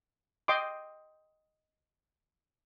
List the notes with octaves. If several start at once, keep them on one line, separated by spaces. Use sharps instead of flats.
D#5 G5 C6 D6